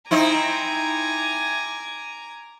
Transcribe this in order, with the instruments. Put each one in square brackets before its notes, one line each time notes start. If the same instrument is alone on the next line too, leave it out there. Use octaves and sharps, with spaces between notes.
[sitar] C4 D#4 E4 [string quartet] G#5 A#5 D6